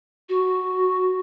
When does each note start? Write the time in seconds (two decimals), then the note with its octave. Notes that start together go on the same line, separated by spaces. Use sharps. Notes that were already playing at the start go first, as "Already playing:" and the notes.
0.29 F#4